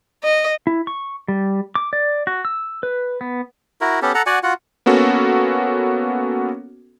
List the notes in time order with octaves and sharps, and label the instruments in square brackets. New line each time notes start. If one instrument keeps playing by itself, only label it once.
[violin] D#5
[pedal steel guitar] E4
C#6
G3
D6
D5
F#4
E6
B4
B3
[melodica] E4 F#4 A#4
B3 C#4 G4 A4
A4 F#5 A#5
F#4 D5 F#5 G#5
F4 F#4 F#5
[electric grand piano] A#3 B3 C#4 F#4 A4